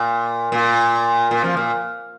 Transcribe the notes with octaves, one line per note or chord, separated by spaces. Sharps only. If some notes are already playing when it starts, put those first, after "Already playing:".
Already playing: A#2
A#2
A#2
F3
A#2